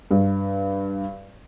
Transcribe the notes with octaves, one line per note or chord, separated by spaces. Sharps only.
G2